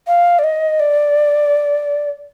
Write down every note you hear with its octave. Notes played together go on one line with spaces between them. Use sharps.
F5
D5
D#5
D5